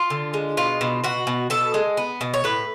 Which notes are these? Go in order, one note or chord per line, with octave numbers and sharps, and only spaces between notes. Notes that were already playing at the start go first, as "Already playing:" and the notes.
Already playing: F4
D3
G#3
B2 F4
B2
B2 F#4
B2
B2 A4
G#3
B3
B2
C#5
A2 B4